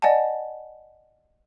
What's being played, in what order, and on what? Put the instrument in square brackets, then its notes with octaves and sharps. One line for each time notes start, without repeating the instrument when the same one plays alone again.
[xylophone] D5 D#5 F#5 G#5 A5